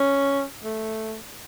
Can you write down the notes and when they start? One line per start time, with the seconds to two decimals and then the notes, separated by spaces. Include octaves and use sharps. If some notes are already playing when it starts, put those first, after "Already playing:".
Already playing: C#4
0.64 A3